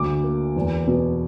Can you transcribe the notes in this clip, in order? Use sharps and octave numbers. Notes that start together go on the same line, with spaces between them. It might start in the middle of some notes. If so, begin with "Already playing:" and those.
Already playing: D2 D6
A#3
E2
B2